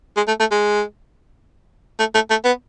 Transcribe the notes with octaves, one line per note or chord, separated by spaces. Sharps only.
G#3
A3
A3
G#3
A3
A3
A3
B3